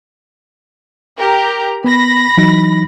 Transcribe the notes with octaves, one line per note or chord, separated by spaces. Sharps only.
G4 A#4 A#5
B3 B5 A#6
E3 F#3 D#4